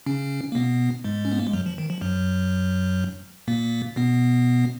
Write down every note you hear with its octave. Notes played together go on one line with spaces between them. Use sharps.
C#3 C#4
A#3
B2 B3
G#2 G#3
C#4
B3
A#3
G#3
F#2 F#3
F3
D#3
F3
F#2 F#3
A#2 A#3
B2 B3